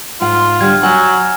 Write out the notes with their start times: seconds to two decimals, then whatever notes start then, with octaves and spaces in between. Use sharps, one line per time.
0.21 G#2 F4 F#5
0.61 D3 G3 F6 G#6
0.83 F#3 F#5 G#5